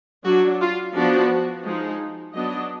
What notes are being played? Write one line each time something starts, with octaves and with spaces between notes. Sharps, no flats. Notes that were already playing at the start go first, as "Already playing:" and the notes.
F#3 D4 F#4
F4
F3 B3 D4 F#4
F3 G#3 D#4
F#3 B3 D4 D#5